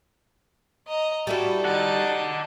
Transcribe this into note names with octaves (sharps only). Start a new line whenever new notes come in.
D#5 A#5
G3 E4 F#4 A4
D#4 A4 D5 F#5